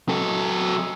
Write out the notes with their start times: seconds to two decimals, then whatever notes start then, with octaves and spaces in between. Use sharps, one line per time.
0.09 F#3 A4